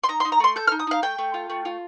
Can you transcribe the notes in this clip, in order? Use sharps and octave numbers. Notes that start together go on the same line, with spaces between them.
C6
D#4 A#5
C6
D#4
A#5
A3 C6
A4 G6
F6
D#4
D#6
D#4 F5
A3 G5
A3
F4
A3
F4